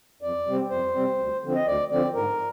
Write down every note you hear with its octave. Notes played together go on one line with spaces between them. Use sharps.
F2 D5
C3 G3 C4
F2 C5
C3 G3 C4
D2
D3 F3 C4
D#5
D2 D5
D3 F3 C4 D5
G#2 A#4